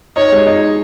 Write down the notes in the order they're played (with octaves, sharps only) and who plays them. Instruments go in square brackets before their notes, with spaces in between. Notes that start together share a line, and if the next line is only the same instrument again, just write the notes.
[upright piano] D#4 [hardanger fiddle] C#5
[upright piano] G#3
D#4